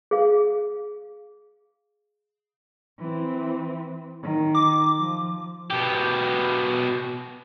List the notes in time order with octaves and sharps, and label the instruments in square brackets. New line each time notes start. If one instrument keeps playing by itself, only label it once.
[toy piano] G#4 F5
[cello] E3 C4
D#3
[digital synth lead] D6
[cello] F3
[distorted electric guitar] B2 G4